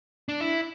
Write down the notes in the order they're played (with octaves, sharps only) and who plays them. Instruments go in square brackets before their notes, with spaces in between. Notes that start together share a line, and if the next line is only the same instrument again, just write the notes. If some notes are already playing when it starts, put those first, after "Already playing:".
[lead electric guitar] D4
E4